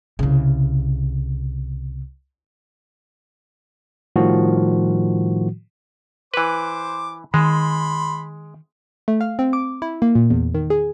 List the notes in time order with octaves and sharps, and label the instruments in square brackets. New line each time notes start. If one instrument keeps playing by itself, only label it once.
[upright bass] C2 C#3
[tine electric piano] A2 D#3 F3 G3 F#4
[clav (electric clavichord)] E3 B4 [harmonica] C5 D6
[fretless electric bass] D#3 [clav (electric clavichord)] G#3 [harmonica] B5 C6
[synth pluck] A3
F5
C4
D6
E4
A#3
A#2
E2
D#3
G#4